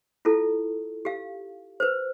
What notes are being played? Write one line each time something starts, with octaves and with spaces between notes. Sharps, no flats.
E4 F4 A4
G4 F5
B4 C5